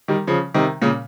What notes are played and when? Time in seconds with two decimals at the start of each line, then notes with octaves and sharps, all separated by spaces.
0.08 D#3 G3
0.27 C#3 F3
0.54 C3 D#3
0.82 A#2 C#3